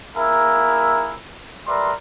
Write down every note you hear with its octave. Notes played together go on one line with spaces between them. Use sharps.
A#3 E4 G#4 A#4 E5
G3 A#4 B4 D5 E5 C6